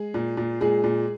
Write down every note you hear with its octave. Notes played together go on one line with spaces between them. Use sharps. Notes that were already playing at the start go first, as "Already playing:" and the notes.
Already playing: G#3 G#4
A#2
A#2
A#2 G#3 G#4
A#2